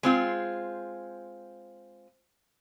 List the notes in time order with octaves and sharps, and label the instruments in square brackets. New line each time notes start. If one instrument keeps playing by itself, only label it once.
[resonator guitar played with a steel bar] G#3 C4 F4